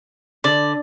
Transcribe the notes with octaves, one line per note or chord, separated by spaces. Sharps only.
D3 D5